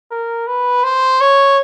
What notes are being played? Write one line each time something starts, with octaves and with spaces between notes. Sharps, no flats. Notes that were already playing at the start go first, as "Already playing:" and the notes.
A#4
B4
C5
C#5